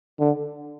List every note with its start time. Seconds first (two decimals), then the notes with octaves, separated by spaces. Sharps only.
0.20 D3